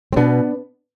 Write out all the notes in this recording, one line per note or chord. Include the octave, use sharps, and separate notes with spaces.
C4
B2 B3 D4